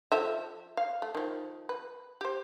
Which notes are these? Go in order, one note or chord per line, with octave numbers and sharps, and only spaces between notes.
F3 A4 E5
F5
A3
D#3 F3
B4
G4 C5